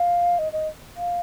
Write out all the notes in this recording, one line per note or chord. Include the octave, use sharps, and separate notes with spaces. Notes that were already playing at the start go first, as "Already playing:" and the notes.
Already playing: F5
D#5
D#5
F5